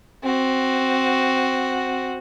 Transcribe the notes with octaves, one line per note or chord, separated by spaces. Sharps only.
C4 F#4